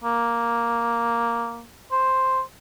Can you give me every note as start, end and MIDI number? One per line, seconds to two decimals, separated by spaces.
0.04 1.65 58
1.91 2.41 72